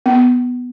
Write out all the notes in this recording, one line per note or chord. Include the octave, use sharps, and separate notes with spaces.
B3